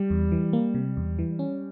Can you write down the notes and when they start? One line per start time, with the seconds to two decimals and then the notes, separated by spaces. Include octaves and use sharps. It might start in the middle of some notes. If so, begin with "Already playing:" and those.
Already playing: G3
0.10 E2
0.32 E3
0.53 A#3
0.74 C3
0.97 E2
1.19 E3
1.39 C#4